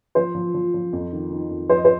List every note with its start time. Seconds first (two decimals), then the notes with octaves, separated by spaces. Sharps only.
0.15 F3 C5
0.35 F3
0.54 F3
0.74 F3
0.93 F2
1.12 D#3
1.31 D#3
1.50 F2
1.69 F3 C5
1.77 D#5
1.85 C5